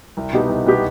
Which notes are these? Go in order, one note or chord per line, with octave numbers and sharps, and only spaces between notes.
C2
B2 B3 D#4 G4
C2
B2 B3 D#4 G4